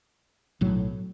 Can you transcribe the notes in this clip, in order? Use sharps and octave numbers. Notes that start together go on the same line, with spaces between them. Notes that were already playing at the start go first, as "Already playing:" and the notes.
B1 A2 F#3